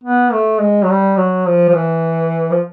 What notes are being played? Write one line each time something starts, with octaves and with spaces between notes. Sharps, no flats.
B3
A3
G#3
F#3
G3
F#3
F3
F3
E3
F3